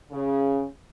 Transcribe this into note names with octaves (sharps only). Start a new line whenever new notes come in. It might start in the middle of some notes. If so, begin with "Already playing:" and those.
C#3